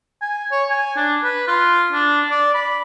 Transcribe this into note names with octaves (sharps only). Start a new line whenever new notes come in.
G#5
C#5
G#5
D4
B4
F4
D4
D5
B5